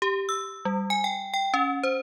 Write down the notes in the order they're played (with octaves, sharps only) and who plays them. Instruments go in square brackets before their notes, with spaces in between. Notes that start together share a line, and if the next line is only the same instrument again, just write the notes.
[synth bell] G4
E6
G3
G#5
G5
G5
C#4
C5